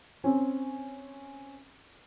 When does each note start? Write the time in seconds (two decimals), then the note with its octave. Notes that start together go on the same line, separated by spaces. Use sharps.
0.24 C4 C#4